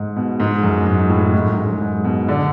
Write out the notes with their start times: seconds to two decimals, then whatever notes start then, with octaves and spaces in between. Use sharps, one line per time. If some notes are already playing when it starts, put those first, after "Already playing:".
Already playing: G#2
0.16 B2
0.40 G#2
0.63 F#2
0.87 G#2
1.10 A2
1.34 G#2
1.46 F#2
1.57 G#2
1.69 F#2
1.81 G#2
2.04 B2
2.28 D3